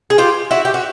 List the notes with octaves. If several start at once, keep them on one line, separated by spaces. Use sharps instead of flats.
G#4
F4 G4
E4 F#4
G4
F#4